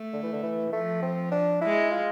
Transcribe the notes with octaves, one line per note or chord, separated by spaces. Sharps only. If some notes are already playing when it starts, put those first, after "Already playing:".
Already playing: A3
D3
E3
D3
E3
F3 A3
C4
D4
G#3 E4
F4